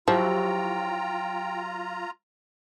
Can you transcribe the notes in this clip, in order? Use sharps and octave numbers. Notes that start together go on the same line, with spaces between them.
F3 F#3 E4 F4 G4 G5 A#5